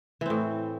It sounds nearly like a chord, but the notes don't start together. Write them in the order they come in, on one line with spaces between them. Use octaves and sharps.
E3 C4 A2